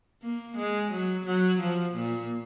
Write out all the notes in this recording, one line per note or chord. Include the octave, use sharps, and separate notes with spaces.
A#3
G#3
F#3
F#3
F3
A#2